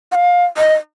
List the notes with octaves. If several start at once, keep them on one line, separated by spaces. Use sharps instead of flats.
F#5
F5
D#5